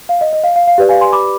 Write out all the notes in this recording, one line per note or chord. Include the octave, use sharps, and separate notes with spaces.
F5
D#5
D#5
F5
F5
F5
G4 B4 D5
F5 G#5
G#5 C6
B5 D6